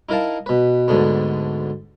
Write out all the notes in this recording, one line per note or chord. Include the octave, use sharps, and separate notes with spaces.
D#4 E4 A#4 F5 A5
B2 B4
D2 G#2 D3 B3